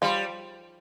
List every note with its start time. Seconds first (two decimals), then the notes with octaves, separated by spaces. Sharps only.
0.02 F3 G3